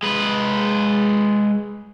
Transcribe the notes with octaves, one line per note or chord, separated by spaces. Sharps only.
G#3 B4